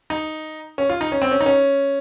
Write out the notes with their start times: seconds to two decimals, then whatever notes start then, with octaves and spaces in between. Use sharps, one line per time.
0.10 D#4
0.78 C#4
0.89 F4
1.01 D#4
1.12 C#4
1.22 C4
1.31 C#4
1.41 D#4
1.46 C#4